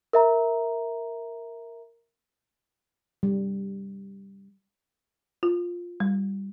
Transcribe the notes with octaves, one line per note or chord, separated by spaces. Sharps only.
A#4 E5 A#5
G3
F4
G3